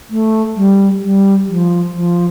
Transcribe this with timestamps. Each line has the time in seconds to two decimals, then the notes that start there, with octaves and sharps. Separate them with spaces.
0.10 A3
0.56 G3
1.03 G3
1.48 F3
1.94 F3